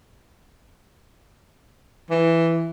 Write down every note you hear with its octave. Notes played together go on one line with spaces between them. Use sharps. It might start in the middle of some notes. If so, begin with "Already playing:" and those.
E3